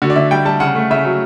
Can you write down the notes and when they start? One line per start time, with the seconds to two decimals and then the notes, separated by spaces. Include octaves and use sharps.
0.02 D3 F#4
0.10 D5
0.16 D3 E5
0.31 G3 G5
0.45 G3 A5
0.60 C#3 F#5
0.75 A3
0.91 C#3 E5
1.05 F#3